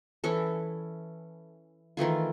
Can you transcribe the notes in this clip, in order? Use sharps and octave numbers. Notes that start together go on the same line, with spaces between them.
E3 C#4 A4
D#3 E3 A3 F4